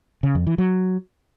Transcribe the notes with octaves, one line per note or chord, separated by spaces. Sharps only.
C#3
F2
E3
F#3